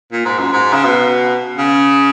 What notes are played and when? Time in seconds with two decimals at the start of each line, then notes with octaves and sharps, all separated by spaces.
0.12 A#2
0.25 G#2
0.39 F#2
0.53 G#2
0.73 C#3
0.85 B2
1.58 C#3